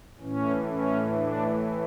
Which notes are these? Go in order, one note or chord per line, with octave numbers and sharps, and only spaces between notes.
A2 E3 C#4
C#4
D4